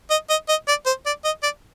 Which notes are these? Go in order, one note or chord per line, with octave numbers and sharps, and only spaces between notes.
D#5
D#5
D#5
D5
C5
D5
D#5
D5